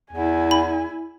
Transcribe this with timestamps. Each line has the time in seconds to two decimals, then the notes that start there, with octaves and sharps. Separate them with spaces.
0.13 E2 E4 G#5
0.51 B5